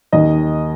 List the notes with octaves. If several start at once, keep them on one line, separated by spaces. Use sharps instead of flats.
D#2 D#5